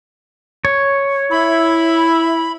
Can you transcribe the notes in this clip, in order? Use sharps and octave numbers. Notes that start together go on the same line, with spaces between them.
C#5
E4 B5